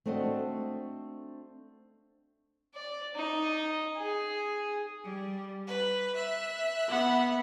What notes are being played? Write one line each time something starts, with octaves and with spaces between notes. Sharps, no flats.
A3 C4 D4 F#4 D#5
D5
D#4
G#4
G3
B4
E5 F#6
B3 F#5